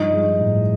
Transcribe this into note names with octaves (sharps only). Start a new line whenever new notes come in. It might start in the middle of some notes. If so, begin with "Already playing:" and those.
Already playing: G2 F3 D#4 D#5
G#3
A2